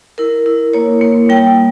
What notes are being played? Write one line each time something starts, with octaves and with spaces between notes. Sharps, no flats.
E4 A#4
E4
A#3 C#5
A#3
G3 G5